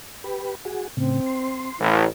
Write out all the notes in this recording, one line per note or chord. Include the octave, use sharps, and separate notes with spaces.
G4 B4
F#4 G#4
A2 C#3 C4
C6
A1 E4